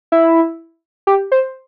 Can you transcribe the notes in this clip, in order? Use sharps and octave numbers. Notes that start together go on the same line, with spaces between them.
E4
G4
C5